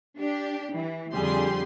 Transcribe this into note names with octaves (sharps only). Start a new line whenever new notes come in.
D4 G4
E3
F2 D3 G3 G#4 C6